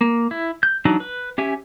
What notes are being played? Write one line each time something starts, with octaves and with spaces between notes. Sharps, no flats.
A#3
E4
G6
E3 F#3 D4 D#4
B4
C#4 G4 E5 G#5